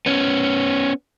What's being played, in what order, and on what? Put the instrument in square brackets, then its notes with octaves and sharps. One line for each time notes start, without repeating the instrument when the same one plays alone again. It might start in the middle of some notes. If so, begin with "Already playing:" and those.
[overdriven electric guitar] B3 C#4